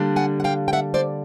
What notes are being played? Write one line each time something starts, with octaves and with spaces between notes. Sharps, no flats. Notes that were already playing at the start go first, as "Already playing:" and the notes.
Already playing: D3 G3 A#3 D4
F#5 G#5
F#5
F5 G5
G5
E5 F#5
C5 D5